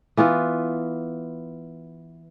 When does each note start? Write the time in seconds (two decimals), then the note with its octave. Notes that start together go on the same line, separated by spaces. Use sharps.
0.17 E3 B3 F4 B4